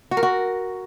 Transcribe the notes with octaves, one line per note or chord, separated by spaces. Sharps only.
F#4
A#4
F#4